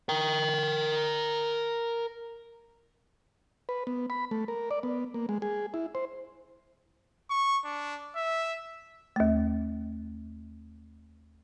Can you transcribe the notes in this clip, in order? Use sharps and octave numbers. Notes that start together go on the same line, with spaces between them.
A#4 G5
B4
B3
B5
A3
A#4
D5
B3
A#3
G#3
G#4
E4
C5
C#6
D4
E5
D#2 A3